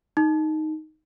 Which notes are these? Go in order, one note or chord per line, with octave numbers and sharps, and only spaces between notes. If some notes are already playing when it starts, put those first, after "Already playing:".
D#4